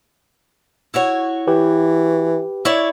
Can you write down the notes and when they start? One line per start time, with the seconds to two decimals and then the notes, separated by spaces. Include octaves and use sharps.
0.94 E4 F#4 C#5
1.47 E3 G4 B4
2.65 E4 C#5 D5